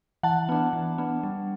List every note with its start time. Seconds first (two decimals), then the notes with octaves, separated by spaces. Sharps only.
0.23 E3 F#5 A5
0.49 B3 D4
0.73 E3
0.98 B3 D4
1.23 G3